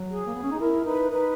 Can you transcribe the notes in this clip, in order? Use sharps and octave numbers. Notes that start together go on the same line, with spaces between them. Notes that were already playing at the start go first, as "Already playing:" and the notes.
Already playing: F#3
G#4
A#3
B3
C#4
D#4
E4 A#4
D#4 B4
D#4 B4